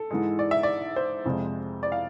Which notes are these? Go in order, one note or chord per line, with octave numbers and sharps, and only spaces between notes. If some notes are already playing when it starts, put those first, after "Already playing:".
Already playing: A4
G#2 E3 G#3
D5
E5
D5
C5
F2 C3 F3 G#3
D5
F5